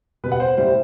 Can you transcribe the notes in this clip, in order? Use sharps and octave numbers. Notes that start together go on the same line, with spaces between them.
B2 G3 B4
F#5
C5
A2 G3 C5